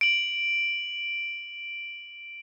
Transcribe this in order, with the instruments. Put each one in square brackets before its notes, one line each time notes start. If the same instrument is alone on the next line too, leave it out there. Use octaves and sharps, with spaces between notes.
[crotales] D7 F#7